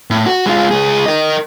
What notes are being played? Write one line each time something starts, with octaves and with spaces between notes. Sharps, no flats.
A2
F#4
G#3 F4
C#2 G#4
A#4 D#5